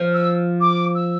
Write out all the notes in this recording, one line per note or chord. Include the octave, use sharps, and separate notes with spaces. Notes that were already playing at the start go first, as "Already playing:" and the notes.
Already playing: F3
E6
D6
E6